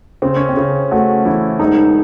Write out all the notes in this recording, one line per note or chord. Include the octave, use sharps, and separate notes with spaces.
C#3 C4
C#4
C4
C#3
A3 F#4
E3 E4
E1 D#4